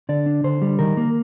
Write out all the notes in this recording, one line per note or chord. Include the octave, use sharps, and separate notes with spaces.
D3 D5
D4
D3 C5
G3
D#3 A#4
A#3